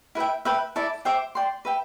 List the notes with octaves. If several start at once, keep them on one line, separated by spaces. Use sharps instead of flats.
E4 B4 E5 G5
B4 E5 G5
E4 A4 D5
C5 E5 G5 D6
D5 G5 C6
B4 E5 G5